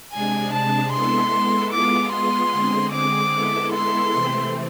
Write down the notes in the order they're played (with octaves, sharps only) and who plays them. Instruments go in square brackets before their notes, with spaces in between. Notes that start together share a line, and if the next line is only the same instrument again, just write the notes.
[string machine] C3 G#3 D4 G#4 [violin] G#5
[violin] A5
[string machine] G#3 B3 E4 A4 [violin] C6
[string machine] G#3 B3 F4 G#4 [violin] D6
[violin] C6
[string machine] D3 G#3 C4 G#4
[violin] D6
[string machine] G#3 B3 E4 A4
[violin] C6
[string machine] C3 E3 A3 C4